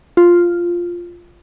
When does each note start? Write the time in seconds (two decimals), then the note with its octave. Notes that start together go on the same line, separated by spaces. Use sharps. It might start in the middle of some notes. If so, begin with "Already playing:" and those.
0.17 F4